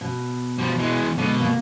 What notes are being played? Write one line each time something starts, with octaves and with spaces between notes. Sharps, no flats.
B2
B2 F3 G3
E3 G#3
B2 D3 G#3
A#3